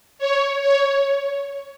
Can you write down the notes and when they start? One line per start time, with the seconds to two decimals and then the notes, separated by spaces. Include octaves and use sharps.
0.19 C#5
0.61 C#5